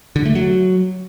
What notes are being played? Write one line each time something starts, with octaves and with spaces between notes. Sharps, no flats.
D3
A3
F#3